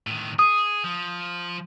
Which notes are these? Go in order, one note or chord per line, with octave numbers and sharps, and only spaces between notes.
A2 D#3
G#4 D#6
F3